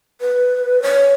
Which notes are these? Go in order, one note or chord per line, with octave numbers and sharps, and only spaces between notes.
B4
C#5